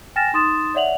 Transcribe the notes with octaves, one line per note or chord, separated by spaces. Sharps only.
G5 G#5 F6 A6 A#6 E7
D#4 C6 D#6 A6 E7
C#5 D5 E5 F#5 F7 F#7